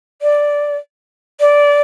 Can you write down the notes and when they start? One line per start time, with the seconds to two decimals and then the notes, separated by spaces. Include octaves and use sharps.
0.22 D5
1.40 D5